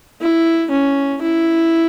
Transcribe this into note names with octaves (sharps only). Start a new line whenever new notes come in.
E4
C#4
E4